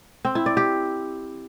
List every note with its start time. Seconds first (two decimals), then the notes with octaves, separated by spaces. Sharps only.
0.25 C4
0.35 E4
0.46 D5
0.57 G4